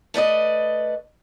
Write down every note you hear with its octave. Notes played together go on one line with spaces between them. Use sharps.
A3 B4 D5 D#5